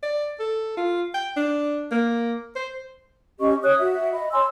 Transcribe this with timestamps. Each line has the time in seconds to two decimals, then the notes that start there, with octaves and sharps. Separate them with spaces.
0.03 D5
0.40 A4
0.77 F4
1.14 G5
1.37 D4
1.91 A#3
2.56 C5
3.40 C#4 G4 D#5 C#6
3.63 C#5 D#6 F#6
3.78 F#4 E5
4.13 D#5 B5
4.33 C#5 G#5 C6 E6